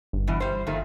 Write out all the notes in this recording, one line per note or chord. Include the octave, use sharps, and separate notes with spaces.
G1
B2 E3
G3 C5
A#2 D#3 A3